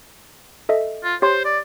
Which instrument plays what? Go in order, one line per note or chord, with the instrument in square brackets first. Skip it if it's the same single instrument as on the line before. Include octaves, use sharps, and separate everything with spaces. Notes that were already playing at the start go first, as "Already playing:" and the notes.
[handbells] A4 D#5 E5
[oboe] F4
[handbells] G4 C#5 C6 [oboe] C5
[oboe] D5